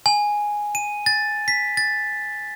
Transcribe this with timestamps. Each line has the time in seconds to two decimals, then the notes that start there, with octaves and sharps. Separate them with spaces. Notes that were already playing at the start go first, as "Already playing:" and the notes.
0.06 G#5
0.75 D#7
1.06 A6
1.48 B6
1.77 A6